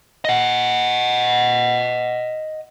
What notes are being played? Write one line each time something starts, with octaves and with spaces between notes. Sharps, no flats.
D#5 F#5